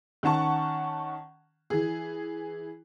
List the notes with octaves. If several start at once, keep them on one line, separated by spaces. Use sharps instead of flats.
D#3 C#4 F#5 A5 C#6
E3 G#4